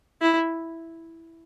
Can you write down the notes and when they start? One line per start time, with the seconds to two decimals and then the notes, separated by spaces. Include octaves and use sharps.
0.21 E4